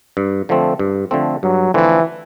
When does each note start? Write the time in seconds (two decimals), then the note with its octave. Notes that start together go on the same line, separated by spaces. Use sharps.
0.17 G2
0.49 D3 F3 A3 C4
0.79 G2
1.11 D3 F3 A3 C4
1.43 G2 F#3
1.74 D3 E3 F3 A3 C4